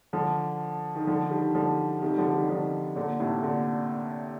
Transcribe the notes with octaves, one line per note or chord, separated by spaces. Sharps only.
D3 F3
D#3
D3 F3
D#3 G3
D3 F3
C3 D#3
G3
D3 F3
D#3 G3
D#3
D3 F3
A#2 D3
A2 C3
A#2 D3